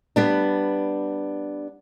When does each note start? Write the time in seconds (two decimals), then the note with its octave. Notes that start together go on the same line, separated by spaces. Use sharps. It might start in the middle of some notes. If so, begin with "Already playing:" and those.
0.16 G3 B3 D4